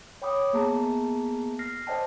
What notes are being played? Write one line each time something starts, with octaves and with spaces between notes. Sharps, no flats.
C#5 G5 B5 D6 D#6
A#3 B3 G#4 A5 A#5
F6 A#6 C7
C5 D5 D#5 G5 A5